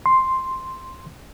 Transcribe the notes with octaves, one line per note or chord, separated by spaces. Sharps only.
C6